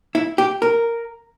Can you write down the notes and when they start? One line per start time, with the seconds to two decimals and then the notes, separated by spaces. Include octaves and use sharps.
0.15 E4
0.38 G4
0.62 A#4